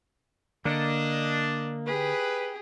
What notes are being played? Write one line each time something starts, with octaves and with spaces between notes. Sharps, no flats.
D3 A#3 D4 D#5
G4 G#4 B4